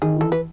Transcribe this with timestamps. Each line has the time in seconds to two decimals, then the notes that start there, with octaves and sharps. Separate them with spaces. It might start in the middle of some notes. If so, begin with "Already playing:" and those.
0.02 D#3 G#4
0.16 E3 A4
0.32 B4